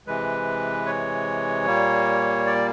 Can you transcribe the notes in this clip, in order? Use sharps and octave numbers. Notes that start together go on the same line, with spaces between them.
C3 E3 G#3 B4
C#5
A#2 G3 A#3
D5